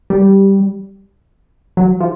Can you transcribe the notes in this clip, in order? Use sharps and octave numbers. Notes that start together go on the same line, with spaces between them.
G3
F#3
F3